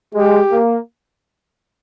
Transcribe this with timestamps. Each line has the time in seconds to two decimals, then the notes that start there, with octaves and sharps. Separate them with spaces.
0.14 G#3 G4
0.52 A#3